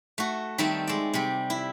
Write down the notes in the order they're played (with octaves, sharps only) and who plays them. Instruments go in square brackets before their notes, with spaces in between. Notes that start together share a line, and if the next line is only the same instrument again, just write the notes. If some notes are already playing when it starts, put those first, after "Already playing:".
[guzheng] A3 F#4
D#3 G3 A3 C4 A4
G#3 D5
C3 G3
E4